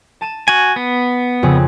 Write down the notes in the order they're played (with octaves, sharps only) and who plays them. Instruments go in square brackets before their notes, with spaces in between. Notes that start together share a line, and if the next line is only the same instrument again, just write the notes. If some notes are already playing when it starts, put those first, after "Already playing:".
[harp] A5 D#7 E7
[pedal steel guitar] F#4 G#5
B3
[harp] F2 C#3 G#4